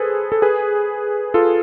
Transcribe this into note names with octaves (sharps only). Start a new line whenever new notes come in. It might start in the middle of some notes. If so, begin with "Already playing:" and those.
Already playing: G#4 A4 B4 C5
A4
G#4 B4
F4 A4